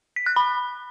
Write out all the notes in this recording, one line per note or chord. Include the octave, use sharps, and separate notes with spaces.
B6
F#6
B5